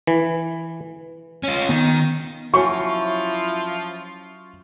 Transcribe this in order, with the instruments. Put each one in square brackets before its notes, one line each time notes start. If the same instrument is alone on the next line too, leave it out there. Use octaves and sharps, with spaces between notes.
[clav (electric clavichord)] E3
[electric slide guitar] C#4 F4
[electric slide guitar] D#3 [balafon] B3
[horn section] F3 F4 [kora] F#3 C#4 [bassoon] E4 [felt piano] C#6